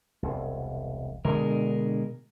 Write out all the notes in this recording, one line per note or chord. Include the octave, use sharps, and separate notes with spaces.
E1 C2
B2 D3 G#3 D4 A#4